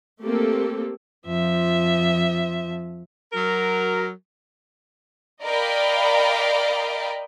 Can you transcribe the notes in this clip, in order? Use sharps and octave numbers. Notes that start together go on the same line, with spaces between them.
A3 A#3 C4 G4 A4
F2 F3 E5
F#3 F#4 A#4
A#4 D5 D#5 F5 G5 B5